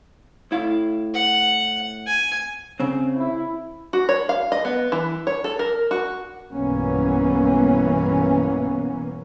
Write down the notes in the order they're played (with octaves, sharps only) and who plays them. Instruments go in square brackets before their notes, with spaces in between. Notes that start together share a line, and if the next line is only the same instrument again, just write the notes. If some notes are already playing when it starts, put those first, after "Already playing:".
[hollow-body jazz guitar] A2 E4 F5
[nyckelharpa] F#5
G#5
[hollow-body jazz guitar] C#3 C4
[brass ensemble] E4
[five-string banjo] F#4
C#5
F5
D#5
B3
E3
C#5
A4
A#4
F#4
[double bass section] B1 G2 E3 A#3 B3 C#4